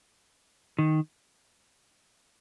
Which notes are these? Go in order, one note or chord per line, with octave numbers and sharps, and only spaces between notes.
D#3